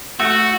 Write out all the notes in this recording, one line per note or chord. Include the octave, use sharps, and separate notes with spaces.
A3 F#4